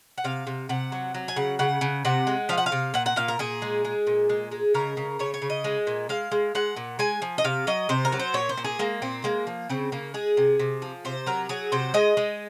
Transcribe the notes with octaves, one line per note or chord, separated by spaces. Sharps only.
F#5
C3 F5
C3
C3 F#5
F#3
F#3
G#5
C#3 F#5
C#3 F#5
C#3
C3 F#5
G#3
F3 F5
F#5
F5
C3
A#2 F#5
F#5
A#2 F5
A#4
A#2 G#4
G#3
G#3
A#2
G#3
G#3
C#3 A#4
C#3
C#3 C#5
C#5
C#3
D#5
G#3
A#2
G#3 F5
G#3
G#3 F#5
A#2
G#3 G#5
F3
D#5
C3 F5
F#3 D#5
C3 C5
A#4
F#3
C5
A#2 C#5
C5
A#2
G#4
G#3 A#3
A#2 C4
G#3 A#3
F3
C#3 C4
C#3 A#3
G#3 G#4
C3
C3
F3
C3 C5
F#3 A#4
F#3 G#4
C3 C5
G#3 D#5
G#3